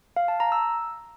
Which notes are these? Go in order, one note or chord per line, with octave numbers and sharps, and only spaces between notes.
F5
A5
A#5
E6